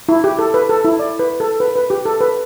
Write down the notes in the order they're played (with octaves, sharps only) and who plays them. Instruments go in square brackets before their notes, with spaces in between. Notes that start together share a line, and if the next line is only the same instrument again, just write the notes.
[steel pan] E4
G4
A4
B4
A4
E4
D5
B4
A4
B4
B4
G4
A4
B4